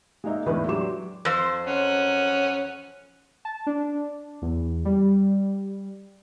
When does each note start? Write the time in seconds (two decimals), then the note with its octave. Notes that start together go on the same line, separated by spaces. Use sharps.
0.24 G#3 A#3 D#4 D#5 E5
0.46 E2 A2 D3 G#3 B4 D5
0.68 F#3 G4 D5 C6 D6 E7
1.25 F2 C5
1.67 C#4 F#5
3.45 A5
3.67 D4
4.42 E2
4.85 G3